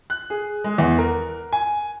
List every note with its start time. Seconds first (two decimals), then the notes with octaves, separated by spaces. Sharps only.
0.10 F#6
0.30 G#4
0.64 G#3
0.78 E2
0.99 A#4
1.53 G#5